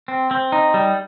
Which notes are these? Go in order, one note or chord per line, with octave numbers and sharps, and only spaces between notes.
C4
C4
D#4
G3